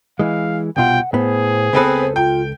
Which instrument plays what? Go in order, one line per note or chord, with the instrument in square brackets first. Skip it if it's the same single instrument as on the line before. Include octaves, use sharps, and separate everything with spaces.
[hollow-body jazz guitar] E3 G#3 [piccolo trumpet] F5
[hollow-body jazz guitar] C2 B2 F4 [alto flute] F#5 [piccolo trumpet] G5
[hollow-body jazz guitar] A2 B3 [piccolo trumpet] G#4 [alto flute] C5
[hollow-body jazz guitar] C#2 A4 [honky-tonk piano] B3 C4 B4
[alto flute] F4 [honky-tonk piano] G5